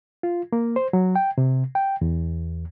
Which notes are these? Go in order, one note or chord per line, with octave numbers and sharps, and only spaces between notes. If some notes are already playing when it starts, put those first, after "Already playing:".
F4
A#3
C5
F#3
G5
C3
G5
E2